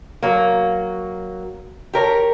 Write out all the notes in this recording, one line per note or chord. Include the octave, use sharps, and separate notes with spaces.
F#3 A#3
G4 A#4 C#5